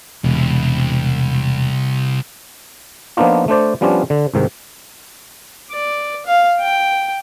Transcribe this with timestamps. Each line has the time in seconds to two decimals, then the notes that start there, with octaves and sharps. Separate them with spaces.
0.24 E1 C2
3.17 F3 A#3 B3 D4 D#4 F4
3.48 A3 D4 C5 D5
3.81 F3 G3 B3 C#4 D4 F4
4.10 D3
4.34 C2 G#2 D#3
5.71 D5
6.26 F5
6.60 G5